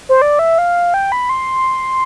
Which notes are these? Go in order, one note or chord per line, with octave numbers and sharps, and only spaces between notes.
C5
D5
E5
F5
G5
B5
C6